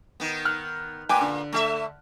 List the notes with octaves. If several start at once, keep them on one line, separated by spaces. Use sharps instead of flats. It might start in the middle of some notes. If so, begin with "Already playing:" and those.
D#3 B3
F6 F#6
A#2 B4 G5 G#5 D6
D3
A3 G4 E5